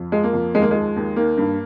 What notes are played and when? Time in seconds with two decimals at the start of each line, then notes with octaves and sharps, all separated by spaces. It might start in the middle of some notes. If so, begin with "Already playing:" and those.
Already playing: F2
0.12 F3 G#3
0.24 A#3
0.33 F2
0.54 D#2 G#3
0.62 A#3
0.71 F3 G#3
0.96 D#2
1.16 D#3 A#3
1.38 G2